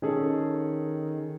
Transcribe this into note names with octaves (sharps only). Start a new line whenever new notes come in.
D#3 C#4 G#4 A4